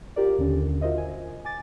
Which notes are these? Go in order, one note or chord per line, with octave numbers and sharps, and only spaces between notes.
F4 G4 A#4 D5
D#2 D3 C#4
F4 F#4 A#4 C5 D#5 E5
G#5
G#5 D6 A6